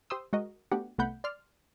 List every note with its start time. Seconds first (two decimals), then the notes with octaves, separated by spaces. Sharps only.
0.10 G4 C5 C6 D#6 E6
0.33 G#3 F#4 A#4 D#5
0.71 A3 B3 D4 F#4 G4 F#5
0.98 C2 A3 B3 F#5 B5 G6
1.24 D5 C6 F6